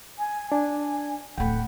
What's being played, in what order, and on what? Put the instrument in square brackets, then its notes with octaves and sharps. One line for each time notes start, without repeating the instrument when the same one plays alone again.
[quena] G#5
[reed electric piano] D4 [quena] G#5
[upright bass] D1 A3 [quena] F#5 [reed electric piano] G5 B5